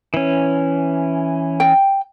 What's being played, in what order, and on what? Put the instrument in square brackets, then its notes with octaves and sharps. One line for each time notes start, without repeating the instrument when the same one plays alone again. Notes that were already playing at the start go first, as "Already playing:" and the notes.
[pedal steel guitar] E3 C#4
[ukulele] G5